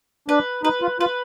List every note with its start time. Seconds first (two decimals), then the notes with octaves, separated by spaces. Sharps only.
0.28 D4 B4
0.63 D#4 B4
0.82 F4
1.00 F4 B4